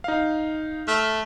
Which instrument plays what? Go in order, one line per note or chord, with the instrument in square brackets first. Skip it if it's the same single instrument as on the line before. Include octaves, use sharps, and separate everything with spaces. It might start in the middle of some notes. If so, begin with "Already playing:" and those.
[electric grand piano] D#4 F5
[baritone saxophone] A3 [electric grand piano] F6